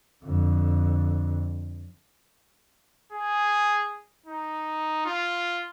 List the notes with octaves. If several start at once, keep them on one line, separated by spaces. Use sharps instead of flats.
F2 D3
G#4
D#4
F4